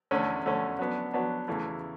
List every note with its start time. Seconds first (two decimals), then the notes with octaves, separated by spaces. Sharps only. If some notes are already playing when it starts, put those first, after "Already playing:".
0.11 E2 D3 A3 C#4
0.44 E2 D3 A3 C#4
0.79 F#3 B3 D4
1.14 F#3 B3 D4
1.48 E2 C#3 E3 A3